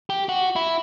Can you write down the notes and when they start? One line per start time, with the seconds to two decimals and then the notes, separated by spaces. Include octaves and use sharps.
0.10 G4
0.29 F#4
0.56 E4